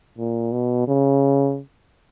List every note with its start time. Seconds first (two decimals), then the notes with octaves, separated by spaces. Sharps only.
0.18 A#2
0.52 B2
0.88 C#3